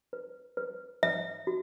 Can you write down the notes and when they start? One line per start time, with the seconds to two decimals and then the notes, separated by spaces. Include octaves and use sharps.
0.13 B4
0.57 B4
1.03 B4 E5
1.47 F#4